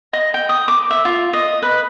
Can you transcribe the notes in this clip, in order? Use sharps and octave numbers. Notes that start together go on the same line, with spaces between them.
D#5
G5
D#6
D6
E5
F4
D#5
B4